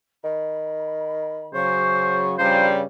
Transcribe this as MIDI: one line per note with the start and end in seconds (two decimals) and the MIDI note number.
0.24 1.57 51
0.24 1.49 83
1.53 2.35 49
1.53 2.35 54
1.53 2.24 72
1.53 2.35 85
2.38 2.84 43
2.38 2.84 49
2.38 2.68 53
2.38 2.84 55
2.38 2.71 72
2.38 2.74 82